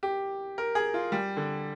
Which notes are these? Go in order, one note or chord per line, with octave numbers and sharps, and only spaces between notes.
G4
A#4
G#4
F4
G3
D3